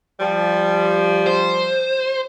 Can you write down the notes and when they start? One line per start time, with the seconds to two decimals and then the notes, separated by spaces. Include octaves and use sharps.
0.20 F3 G3
1.27 C5